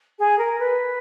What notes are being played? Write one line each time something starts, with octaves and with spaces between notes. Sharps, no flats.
G#4
A#4
B4